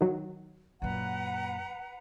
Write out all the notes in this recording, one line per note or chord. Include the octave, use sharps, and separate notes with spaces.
D#3 F#3
F#2 A#2 B4 F#5 A#5